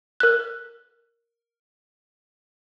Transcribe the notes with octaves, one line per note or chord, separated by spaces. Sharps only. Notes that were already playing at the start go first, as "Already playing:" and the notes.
A#4 F#6